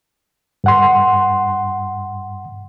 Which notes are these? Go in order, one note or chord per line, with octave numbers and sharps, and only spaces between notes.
G2 F#5 C6